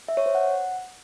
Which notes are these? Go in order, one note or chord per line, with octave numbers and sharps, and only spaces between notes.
E5
C#5
C5
F#5